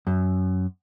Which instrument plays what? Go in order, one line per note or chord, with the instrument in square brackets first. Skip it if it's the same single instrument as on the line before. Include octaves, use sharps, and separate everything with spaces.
[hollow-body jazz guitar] F#2